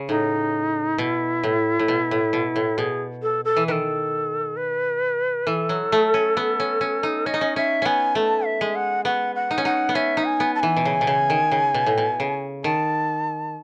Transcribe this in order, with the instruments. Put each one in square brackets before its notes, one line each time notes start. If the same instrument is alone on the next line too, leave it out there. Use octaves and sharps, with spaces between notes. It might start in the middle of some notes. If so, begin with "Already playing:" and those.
Already playing: [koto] C#3
[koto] A2 [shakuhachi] D#4
[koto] B2 [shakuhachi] E4
[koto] A2
A2
B2
A2
B2
A2
[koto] B2 [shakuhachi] G#4
[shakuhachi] A4
A4
[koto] E3
[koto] D#3 [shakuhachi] A4 B4
[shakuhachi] B4
[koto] E3 [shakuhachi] A4
[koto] F#3
A3
C#4
B3
C#4
C#4
D#4
[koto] C#4 [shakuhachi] D#5
[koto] D#4
C#4
[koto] C#4 [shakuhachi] E5
[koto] B3 C#4 [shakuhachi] G#5
[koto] A3 [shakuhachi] A5
[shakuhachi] E5
[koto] G#3
[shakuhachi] F#5
[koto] B3 [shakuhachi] F#5
[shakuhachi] F#5
[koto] D#4
C#4
[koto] D#4 [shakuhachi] F#5
[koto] B3
[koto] C#4 [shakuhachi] E5
[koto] D#4
[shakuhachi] G#5
[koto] B3
[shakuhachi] A5
[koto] E3 [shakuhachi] G#5
[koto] B2
C#3
B2
C#3
D#3
C#3
B2
A2
B2
C#3
[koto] D#3 [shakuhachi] A5